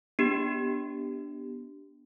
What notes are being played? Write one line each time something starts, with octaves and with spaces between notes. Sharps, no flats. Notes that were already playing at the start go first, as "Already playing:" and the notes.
B3 D4 G4